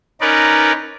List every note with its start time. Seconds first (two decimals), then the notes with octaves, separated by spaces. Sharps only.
0.21 C#4 D#4 A#4 B4 D5